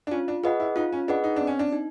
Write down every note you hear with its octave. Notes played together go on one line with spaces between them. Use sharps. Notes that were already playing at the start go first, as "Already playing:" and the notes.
D4
C#4 F4
D4
F4 G#4 B4 D#5 F#5
E4
D#4 F4
C#4
D4 G#4 B4 D#5 F#5
D#4
C4 D4
C#4
D4
D#4